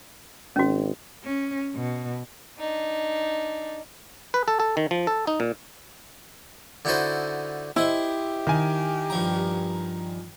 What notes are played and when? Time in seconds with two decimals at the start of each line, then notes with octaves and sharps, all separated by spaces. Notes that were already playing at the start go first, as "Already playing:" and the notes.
0.56 G#1 C#4 F#4
1.24 C#4
1.75 B2
2.59 D4 D#4
4.34 B4
4.48 A4
4.60 A4
4.77 D#3
4.91 F3
5.07 A4
5.27 D#4
5.40 A#2
6.85 D3 D#4 E4 F#4 A4 C5
7.76 E4 G4 C5 D#5 E5
8.47 D#3 G#5
9.10 G2 F3 A#5